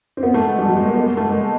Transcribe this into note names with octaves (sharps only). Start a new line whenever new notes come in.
C4
B3
A3
G#3
G3
F#3
G#3
A#3
B3
A#3
A3
G#3